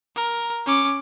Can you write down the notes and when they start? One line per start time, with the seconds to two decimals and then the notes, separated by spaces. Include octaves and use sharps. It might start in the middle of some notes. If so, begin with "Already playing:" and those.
0.16 A#4
0.66 C#4 D6